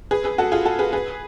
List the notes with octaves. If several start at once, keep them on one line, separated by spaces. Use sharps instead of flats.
G#4 B4
G#4 B4
F#4 A4
F4 G#4
F#4 A4
G#4 B4
G#4 B4